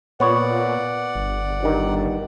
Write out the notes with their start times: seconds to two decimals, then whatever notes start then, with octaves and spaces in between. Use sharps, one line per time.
0.20 A#2 B3 C#5 D5 F#5
1.15 G1
1.63 G2 D#3